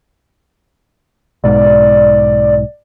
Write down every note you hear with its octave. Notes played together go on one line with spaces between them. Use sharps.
B1 G#2 D5